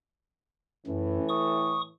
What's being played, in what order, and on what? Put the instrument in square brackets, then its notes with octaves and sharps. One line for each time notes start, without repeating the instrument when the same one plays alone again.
[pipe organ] F#2 [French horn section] A2 E3
[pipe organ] C#6 D#6